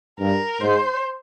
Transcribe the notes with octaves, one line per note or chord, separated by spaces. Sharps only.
G2 A#4
G#2 C5